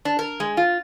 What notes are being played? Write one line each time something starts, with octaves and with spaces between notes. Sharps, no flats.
D4
A#4
G#3
F4